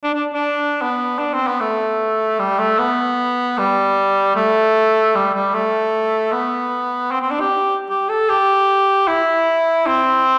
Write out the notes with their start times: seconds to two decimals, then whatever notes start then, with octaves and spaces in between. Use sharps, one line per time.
0.04 D4
0.14 D4
0.34 D4
0.82 B3
1.19 D4
1.34 C4
1.47 B3
1.60 A3
2.39 G3
2.59 A3
2.78 B3
3.58 G3
4.36 A3
5.15 G3
5.34 G3
5.54 A3
6.32 B3
7.11 C4
7.21 C4
7.31 D4
7.40 G4
7.90 G4
8.09 A4
8.29 G4
9.08 E4
9.86 C4